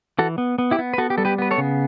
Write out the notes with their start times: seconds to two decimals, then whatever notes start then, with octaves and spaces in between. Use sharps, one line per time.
0.19 E3 F#4 A4
0.38 B3
0.58 B3
0.71 E4 G4
0.79 B3
0.94 B4
0.98 B3 F#4 A4
1.10 G4
1.18 G3 A4
1.25 G4 B4
1.38 B3 B4
1.51 A4 C#5
1.58 C#3